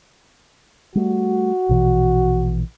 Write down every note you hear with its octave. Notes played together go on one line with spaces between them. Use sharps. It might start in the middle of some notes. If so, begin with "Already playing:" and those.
G3 A3 F#4
A#1 B2 E3